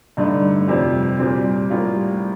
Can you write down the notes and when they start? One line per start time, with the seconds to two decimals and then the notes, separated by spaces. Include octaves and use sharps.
0.17 G2 D3 A3 D#4
0.68 F2 C3 G3
1.19 A#2 G3 C4
1.70 A2 G3 A#3 F4